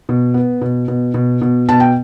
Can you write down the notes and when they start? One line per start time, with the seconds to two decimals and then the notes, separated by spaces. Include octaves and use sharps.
0.09 B2
0.34 B3
0.61 B2
0.88 B2
1.14 B2
1.41 B2
1.69 B2 A5
1.80 G5